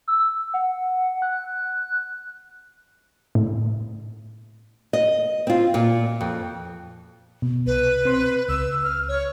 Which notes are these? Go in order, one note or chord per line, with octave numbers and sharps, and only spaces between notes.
E6
F#5
F#6
A2
D#5
C4 F4
A#2
F2
B2
C2 B4
C4 C6
C#2 E6
F6
C#5